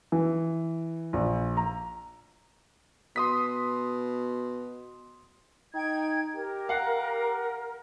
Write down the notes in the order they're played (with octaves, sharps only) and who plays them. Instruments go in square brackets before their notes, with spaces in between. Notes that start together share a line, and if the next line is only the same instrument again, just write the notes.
[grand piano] E3
A#1
A#5
[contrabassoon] B2 [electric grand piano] C6 D#6 B6
[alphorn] D#4 [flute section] G5 G#6
[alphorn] G4 [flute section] A#4
[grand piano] F5 F#5